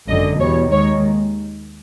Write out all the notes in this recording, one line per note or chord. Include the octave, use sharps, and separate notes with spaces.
G#1 F#2 D3 D#5
E2 B2 G3 C#5
D#2 D#3 G#3 C#5